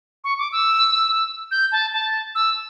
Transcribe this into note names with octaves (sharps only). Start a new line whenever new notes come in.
C#6
D6
E6
G6
A5
A5
E6